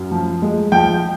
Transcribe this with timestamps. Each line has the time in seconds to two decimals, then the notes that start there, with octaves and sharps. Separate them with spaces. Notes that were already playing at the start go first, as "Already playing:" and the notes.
Already playing: F#2
0.12 F3
0.42 G#3
0.72 F3 G5